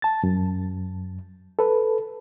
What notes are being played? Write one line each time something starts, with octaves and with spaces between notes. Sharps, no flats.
A5 A6
F#2
A4 B4